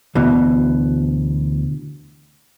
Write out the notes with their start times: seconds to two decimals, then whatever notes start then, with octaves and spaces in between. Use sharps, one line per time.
0.15 D2 B2 E3